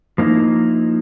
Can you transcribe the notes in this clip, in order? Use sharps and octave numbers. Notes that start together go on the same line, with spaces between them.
F3 A#3 C#4 D#4 E4